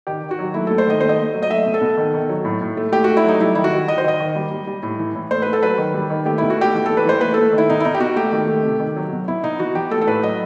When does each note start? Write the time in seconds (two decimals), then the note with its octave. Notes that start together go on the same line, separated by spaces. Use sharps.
0.07 D#3 G4
0.23 D#3
0.31 F#4
0.39 F#3
0.54 A3 E4
0.67 A3 A4
0.78 C5
0.87 D#3 D#5
1.00 A3 C5
1.09 D#5
1.19 A3
1.34 F#3
1.43 D#5
1.50 A3 E5
1.66 B2
1.74 A4
1.81 B2
1.97 D#3
2.14 D#3
2.29 F#3
2.45 A2
2.62 A2
2.77 A3
2.92 A3 G4
3.04 A3 F#4
3.17 E4
3.24 F#3 D#4
3.40 G3 E4
3.55 D#3 E4
3.64 F#4
3.72 D#3
3.88 D#3 D#5
3.98 C5
4.04 D#3 D#5
4.20 D#3
4.36 G3
4.51 G3
4.67 G3
4.83 A2
4.99 E3
5.15 A2
5.31 A3 C5
5.42 A3 B4
5.53 A4
5.63 F#3 B4
5.78 D#3
5.94 G3
6.10 D#3
6.25 A3 G4
6.38 B2 E4
6.50 F#4
6.58 A3 G4
6.74 E3
6.86 A3 A4
6.97 B4
7.05 E3 C5
7.21 A3 B4
7.34 A3 A4
7.53 D#3
7.58 E4
7.69 B2 D#4
7.80 E4
7.85 B2 D#4
7.94 G4
8.00 B2 F#4
8.16 A3 G4
8.32 D#3
8.48 A3
8.64 C3
8.80 D#3
8.96 F#3
9.12 B2
9.28 B2 E4
9.43 B2 D#4
9.59 E3 F#4
9.75 E3 G4
9.91 A3 A4
10.01 A4
10.07 A2 B4
10.23 F#3 D#5